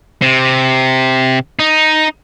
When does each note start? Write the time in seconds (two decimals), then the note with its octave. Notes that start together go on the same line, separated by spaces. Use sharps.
0.22 C3
1.59 D#4